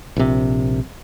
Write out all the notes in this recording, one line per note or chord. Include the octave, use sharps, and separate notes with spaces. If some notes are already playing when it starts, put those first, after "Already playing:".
A#1 C3